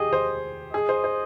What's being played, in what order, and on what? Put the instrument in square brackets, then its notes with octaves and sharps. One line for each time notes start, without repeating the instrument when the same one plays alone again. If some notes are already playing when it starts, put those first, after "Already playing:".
Already playing: [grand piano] G4 G#4 [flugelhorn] D#5
[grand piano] C5
[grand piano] G#4 [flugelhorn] D#5
[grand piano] C5
C5